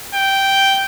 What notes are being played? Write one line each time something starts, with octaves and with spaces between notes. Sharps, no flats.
G5